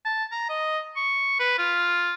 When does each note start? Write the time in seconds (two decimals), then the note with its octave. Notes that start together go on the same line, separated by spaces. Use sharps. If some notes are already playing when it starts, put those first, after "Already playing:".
0.05 A5
0.32 A#5
0.49 D#5
0.96 C#6
1.40 B4
1.59 F4